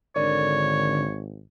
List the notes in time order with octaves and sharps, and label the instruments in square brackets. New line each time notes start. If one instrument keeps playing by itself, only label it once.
[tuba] G#1 [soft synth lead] D3 [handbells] A#4 D5 [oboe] C#5